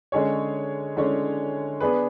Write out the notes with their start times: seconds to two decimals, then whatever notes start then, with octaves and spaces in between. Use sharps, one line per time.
0.12 D3 G#3 C#4 G#4 C#5
0.97 D3 G#3 C#4 G#4 C#5
1.80 B3 D4 G#4 B4